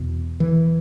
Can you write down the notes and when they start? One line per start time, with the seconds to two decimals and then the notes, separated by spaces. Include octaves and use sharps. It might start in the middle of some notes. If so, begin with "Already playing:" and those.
Already playing: E2 B2
0.40 E3